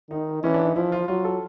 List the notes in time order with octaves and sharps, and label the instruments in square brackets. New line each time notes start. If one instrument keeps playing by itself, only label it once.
[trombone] D#3 [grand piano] D#4
[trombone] E3 [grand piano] C#4
[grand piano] D4
D#4
[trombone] F3 [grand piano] E4
[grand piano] F4
[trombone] F#3 [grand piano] F4
[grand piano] A4